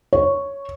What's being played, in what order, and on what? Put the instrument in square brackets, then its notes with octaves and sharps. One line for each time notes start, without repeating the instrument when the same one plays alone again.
[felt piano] C#5